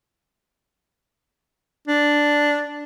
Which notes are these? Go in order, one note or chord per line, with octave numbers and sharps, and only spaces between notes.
D4